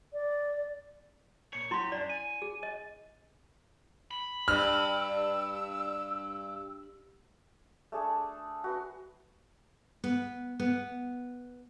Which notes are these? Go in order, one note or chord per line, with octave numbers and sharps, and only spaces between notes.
D5
A#2 C#5
F#3 E4 G4 C6
F#2 D4 D5
G#5
G#4
D#5
B5
G2 E6 F6
A3 D4 G#4 A4
F#4 B4 C6
B3
B3